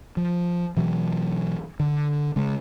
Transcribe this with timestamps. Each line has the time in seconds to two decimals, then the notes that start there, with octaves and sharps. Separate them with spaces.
0.17 F3
0.77 B2 E3 F#3
1.80 D3
2.36 C#3 G#3